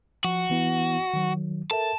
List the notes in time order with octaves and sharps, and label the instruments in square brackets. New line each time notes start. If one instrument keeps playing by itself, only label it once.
[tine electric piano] F3 [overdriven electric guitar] F#4
[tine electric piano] E3 B3 E4
D#3 F#3
[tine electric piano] A4 A#4 E5 [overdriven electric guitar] A5